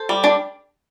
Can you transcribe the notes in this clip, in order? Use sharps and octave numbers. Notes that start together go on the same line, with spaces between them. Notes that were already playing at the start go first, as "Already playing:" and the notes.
Already playing: A4 C5
G3
D4